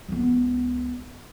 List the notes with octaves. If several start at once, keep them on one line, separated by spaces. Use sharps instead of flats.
C#2 B3